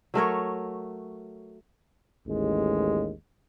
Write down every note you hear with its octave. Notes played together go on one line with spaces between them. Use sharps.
F#3 A3 A#4 C#5
A1 D#2 G#3